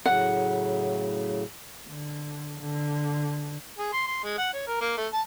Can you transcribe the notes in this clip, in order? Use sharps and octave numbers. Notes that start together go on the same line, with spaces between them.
A2 C#3 F#3 F#5
D3
D3
G#4
C6
C6
G#3
F#5
C#5
A#4
A#3
A3
A5